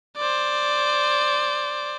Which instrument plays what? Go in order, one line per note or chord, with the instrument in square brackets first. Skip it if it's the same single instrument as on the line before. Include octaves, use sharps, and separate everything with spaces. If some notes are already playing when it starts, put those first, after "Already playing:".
[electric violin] C5 D5